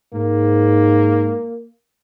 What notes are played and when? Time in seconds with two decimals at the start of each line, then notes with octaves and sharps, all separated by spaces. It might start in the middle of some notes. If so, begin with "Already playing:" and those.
0.13 G#2 A#3